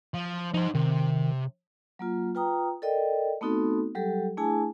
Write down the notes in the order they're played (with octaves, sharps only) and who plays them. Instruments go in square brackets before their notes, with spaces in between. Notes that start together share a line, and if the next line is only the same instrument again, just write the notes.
[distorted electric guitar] F3
[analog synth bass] F3 [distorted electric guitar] D#4 C5
[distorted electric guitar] C3 [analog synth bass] D#3
[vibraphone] F#3 A#3 F4
F4 B4 G5 A#5 D#6
A4 A#4 D5 D#5 G5
A3 B3 C4 D#4 F#4 A4
F#3 G3 G4 A4
A3 D4 E4 G#4 G#5 A5